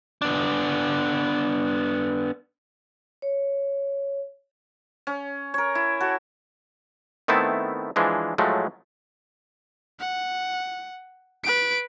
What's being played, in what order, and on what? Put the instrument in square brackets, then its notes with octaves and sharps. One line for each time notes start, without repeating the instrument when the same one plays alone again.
[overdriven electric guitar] B3 D4
[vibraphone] C#5
[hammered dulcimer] C#4
A#4 C#5
E4
F#4 A4
[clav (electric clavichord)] D#3 A3 B3 C4 E4 A5
E3 F3 G#3 D4
A2 F3 F#3 G#3 A3
[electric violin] F#5
B4 D7